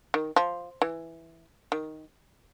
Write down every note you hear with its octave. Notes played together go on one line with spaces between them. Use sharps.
D#3
F3
E3
D#3